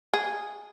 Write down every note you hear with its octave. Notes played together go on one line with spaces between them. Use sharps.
G#4